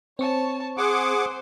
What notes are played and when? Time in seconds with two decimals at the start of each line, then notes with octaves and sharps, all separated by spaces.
0.19 C4 C#5 A5 C#6
0.78 G#4 C5 F#5 D6